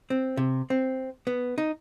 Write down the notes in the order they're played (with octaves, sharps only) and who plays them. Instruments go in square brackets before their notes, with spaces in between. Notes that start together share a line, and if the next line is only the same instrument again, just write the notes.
[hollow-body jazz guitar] C4
C3
C4
B3
D#4